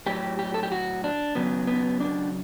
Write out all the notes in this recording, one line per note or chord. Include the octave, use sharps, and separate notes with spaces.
A2 F#3 G4
G4
A4
G4
F#4
D4
C#3 F#3 B3
B3
D4